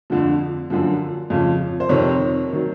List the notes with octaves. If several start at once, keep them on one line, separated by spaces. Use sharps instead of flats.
F2 D3 F3
F#2 D3 F3
F2 C#3 F3
C5
F2 C3 D#3 C#5
D#3 F#3